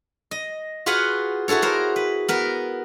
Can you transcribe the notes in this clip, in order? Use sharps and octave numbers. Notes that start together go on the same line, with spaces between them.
D#5
F4 F#4 G#4 B4 F5 F#5
E4 F#4 G#4 A4 C#5
A#4 C5 A#5
B4
B3 A#4 B4